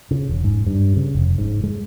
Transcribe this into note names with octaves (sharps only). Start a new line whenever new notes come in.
C#3
E1
G#2
G2
C#3
F1
G#2
G#3